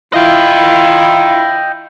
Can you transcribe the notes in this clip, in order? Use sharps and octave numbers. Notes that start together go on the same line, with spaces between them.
E4 F4 D#5 G5